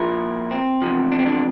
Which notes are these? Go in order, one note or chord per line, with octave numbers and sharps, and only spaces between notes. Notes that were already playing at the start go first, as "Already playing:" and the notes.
Already playing: A#2 F3 A#3 E4
C4
E2 C3 F3
D4
C4
D4